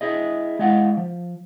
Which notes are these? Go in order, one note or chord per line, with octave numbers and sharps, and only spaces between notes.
E4 G#4 D#5
G#3 E4 D#5 F5 F#5
F3